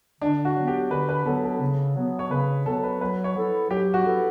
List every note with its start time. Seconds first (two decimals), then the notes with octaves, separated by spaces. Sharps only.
0.21 D3 D4
0.45 F#4
0.56 F#3 B3
0.67 G4
0.91 D3 B4
1.09 B4
1.26 F#3 B3 A4
1.44 A4
1.61 C#3
1.96 F#3 B3
2.19 C#5
2.31 C#3 B4
2.66 F#3 B3 A4
2.84 B4
3.01 F#3 B4
3.24 C#5
3.36 B3 E4 A4
3.70 F#3 G4
3.94 F#4
4.06 B3 E4 A4